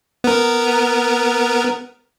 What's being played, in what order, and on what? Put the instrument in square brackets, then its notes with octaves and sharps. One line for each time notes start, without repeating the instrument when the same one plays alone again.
[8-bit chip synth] B3 A#4